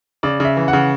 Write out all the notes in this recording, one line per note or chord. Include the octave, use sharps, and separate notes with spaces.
C#3 D5
C#3 E5
E3
F#5
C#3